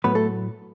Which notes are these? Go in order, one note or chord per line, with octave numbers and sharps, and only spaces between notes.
A2 F#3 A3 B3 B4
A3 A4